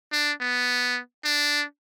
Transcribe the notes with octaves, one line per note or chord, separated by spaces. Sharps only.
D4
B3
D4